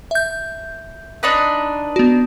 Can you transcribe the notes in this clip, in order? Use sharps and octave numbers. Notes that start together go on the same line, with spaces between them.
E5 G6
D4 D#4 B4
B3 F#4